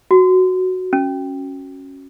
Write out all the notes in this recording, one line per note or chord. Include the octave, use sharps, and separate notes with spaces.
F#4
C#4